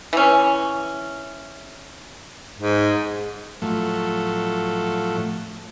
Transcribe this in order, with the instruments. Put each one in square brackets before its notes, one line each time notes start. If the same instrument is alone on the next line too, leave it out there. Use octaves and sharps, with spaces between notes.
[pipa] E3 C#4
[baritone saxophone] G#2
[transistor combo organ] A2 F3 F#3 A3